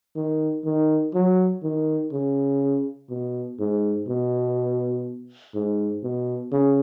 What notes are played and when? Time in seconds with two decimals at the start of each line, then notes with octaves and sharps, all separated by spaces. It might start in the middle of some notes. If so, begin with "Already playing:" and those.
0.16 D#3
0.65 D#3
1.14 F#3
1.63 D#3
2.13 C#3
3.10 B2
3.60 G#2
4.09 B2
5.55 G#2
6.04 B2
6.52 C#3